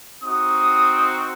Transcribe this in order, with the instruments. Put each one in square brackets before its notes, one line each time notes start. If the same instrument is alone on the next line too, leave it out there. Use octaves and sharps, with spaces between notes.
[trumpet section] C4 D#4 F#4 D#6